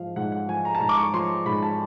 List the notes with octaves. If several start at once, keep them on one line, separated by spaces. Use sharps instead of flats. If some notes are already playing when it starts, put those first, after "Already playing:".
Already playing: G#2 F3 F5
G#2 F#5
F#5
F3 G#5
A#5
A5
G#2 A#5
D6
C#6
F3 C6
G#2 B5
A5